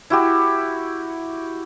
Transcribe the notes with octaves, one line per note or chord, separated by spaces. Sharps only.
E4 F#4 G4